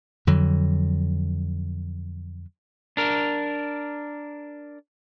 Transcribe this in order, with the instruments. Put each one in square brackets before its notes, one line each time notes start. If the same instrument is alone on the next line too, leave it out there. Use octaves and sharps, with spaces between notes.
[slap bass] F2 D3 F#3
[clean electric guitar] D4 A#4